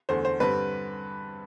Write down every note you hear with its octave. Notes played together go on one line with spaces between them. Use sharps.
E2 D3 A3 C5
C5
G2 D3 G3 C4 B4